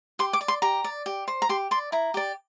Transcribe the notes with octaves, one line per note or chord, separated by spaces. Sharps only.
G4 C6
D6
D5
C6
G4 A#5
D5
G4
C5
A#5
G4 C6
D5 C6
E4 A#5
G4 D5